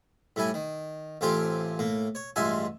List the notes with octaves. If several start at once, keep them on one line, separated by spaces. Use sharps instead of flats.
A2 G3 E4 G#5
D#3
A1 A3 C4 F4 G4 G#5
A2 A#3
C#5
A1 G2 G#3 F4 E5 G#5